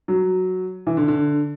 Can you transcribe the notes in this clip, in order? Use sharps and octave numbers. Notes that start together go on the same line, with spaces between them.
F#3
E3
D3
D3